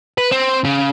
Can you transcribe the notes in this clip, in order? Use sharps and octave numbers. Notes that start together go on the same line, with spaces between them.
B4
C4
C#3